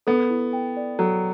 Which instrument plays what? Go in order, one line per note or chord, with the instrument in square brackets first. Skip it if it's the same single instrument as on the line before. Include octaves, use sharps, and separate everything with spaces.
[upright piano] B3 [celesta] A4
[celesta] E4
G5
D5
[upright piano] F#3 [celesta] A4